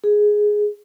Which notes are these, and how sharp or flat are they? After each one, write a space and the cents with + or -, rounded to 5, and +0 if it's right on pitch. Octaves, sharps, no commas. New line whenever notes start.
G#4 +5